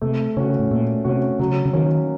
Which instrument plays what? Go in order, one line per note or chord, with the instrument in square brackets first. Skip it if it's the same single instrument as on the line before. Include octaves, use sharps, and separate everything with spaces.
[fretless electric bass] C3 [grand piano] A3
[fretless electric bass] C#3 [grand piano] C#4 F#4
[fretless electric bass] A2
[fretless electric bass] A#2 [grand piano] A3
[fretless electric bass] C3 [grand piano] C#4 F#4
[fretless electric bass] C#3 [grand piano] F#3
[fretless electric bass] C#3
[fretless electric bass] D#3 [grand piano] A#3 C#4 F#4